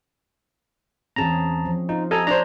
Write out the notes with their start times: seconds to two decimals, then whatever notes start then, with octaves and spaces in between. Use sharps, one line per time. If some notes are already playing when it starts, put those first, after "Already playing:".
1.16 E2 C4 C#4 G#4 A5 A#5
1.65 F3
1.89 D#4 F4
2.11 A4 D#5 G#5 A#5
2.27 D4 C5 C#5 A#5